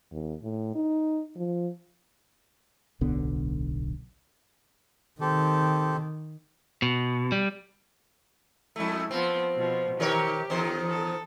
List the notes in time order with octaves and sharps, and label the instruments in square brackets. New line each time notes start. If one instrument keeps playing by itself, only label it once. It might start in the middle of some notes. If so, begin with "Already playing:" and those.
[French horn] D#2
A2
D#4
F3
[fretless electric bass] D1 B1 D3 B3
[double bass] D#3 [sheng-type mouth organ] C4 G4 A4
[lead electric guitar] B2
G3
[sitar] F2 A3 [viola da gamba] G#3 E4
[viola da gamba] F3 B3 [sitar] C4
[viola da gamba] B2 F3
[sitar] D#3 A#4 C#5 [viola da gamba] G4
[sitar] E2 D#3 C5
[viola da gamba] A4